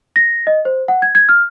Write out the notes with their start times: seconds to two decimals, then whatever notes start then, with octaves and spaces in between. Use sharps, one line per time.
0.16 A#6
0.47 D#5
0.65 C5
0.88 F#5
1.02 G#6
1.15 G#6
1.29 F6